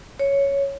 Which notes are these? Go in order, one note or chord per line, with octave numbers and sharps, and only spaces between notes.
C#5